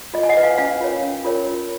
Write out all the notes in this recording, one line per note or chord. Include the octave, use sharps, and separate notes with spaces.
F4 D#5
G#5
D#5 F#5
B4
F5 G#5
C#4 F5 G#5
F4 A#4 C#5
C#4
F4 A#4 C#5
F4